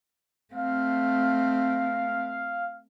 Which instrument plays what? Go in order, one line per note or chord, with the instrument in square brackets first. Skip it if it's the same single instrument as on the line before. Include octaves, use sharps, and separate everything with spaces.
[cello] A3 C4 [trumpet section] F5